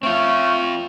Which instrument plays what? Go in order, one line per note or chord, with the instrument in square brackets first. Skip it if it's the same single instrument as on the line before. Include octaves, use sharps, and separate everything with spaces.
[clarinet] A3 [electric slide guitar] C4 F4 [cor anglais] C#4